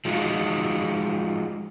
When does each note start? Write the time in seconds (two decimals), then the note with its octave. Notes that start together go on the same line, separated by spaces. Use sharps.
0.05 F3 G#3 D#4 F4 F#4